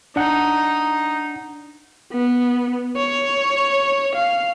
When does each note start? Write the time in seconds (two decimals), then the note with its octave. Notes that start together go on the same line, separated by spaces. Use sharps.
0.16 D4 D#4 F#5
2.12 B3
2.96 C#5
4.15 F5